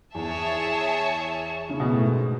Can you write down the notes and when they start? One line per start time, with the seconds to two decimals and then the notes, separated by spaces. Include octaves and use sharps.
0.15 E2 G#4 C#5 E5 A5
1.69 C#3
1.80 B2
1.92 A2
2.02 G#2